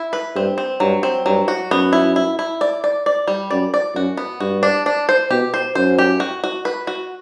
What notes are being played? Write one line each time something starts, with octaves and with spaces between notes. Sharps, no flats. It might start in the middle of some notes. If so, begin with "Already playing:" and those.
Already playing: E4
B4
G2 C4
C4
G2 F#3
C4
G2 F#3
F#4
F#2 B3
E4
E4
E4
D5
D5
D5
G3
F#2 D5
D5
F#2 F#4
B3
G2 F#4
D4
D4
C5
B2 G4
C5
F#2 C5
G4
F#4
F#4
B4
F#4